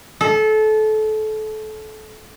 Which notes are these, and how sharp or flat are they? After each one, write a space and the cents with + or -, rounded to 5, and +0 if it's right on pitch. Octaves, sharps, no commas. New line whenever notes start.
A4 -25